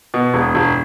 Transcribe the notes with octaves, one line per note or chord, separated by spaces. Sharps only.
B2
E1
E1